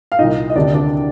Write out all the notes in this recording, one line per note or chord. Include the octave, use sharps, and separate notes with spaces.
F5
C2 A#2 D#4 D#5
D#5
D2 C3 D#3 D4 D5
D4 D5